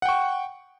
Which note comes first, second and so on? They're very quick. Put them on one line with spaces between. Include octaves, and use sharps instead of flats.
F#5 G5 C#6